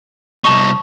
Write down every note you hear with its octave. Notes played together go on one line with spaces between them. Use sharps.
C2 D#4 A5 C#6